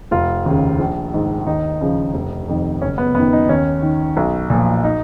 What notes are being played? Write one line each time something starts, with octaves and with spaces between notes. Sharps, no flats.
F1 F4
D#2 C#3
A#1
G#2 D#3
D#2 D#4
C#3 F3
F1
F2 D#3
F#1 C#4
B3
F#2 D#3 B3
D#4
D#2 C#4
D#3
B1
A#2 F3
D#4